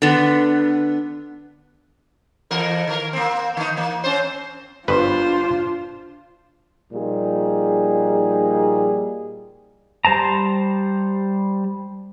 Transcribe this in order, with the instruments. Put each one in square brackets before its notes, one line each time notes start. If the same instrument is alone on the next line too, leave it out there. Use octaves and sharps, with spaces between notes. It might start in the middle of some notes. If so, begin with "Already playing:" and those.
[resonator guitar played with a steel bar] D3 B3
[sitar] F2 E3 A#4
D#3 A#4
A#3 C4
D#3 D#4
E3 A#3
C4 C#4 C5
[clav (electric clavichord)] G1 G2 B4 [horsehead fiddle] D4 F4 [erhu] C5
[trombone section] A#2 F3 G3 D#4 G#4
[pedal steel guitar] G3 C5 A5 A#5